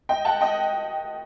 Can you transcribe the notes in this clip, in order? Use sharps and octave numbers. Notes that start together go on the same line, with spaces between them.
D#5 G5
F#5 A5
D#5 G5